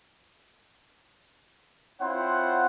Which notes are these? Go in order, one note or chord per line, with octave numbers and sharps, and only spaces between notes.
C4 E4 F4 C5 C#5 F#5